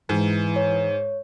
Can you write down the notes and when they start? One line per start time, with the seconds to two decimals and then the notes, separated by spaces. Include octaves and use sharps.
0.09 G#2 E3
0.56 C#5